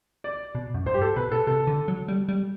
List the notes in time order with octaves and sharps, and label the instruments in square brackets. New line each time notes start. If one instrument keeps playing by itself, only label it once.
[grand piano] D5
[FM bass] B2
F#2
[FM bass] G2 [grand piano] C5
[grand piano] G4
A4
[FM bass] B2 [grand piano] B4
[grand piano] A4
[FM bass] C3 [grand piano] A4
[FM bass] D3
F#3
G3
G3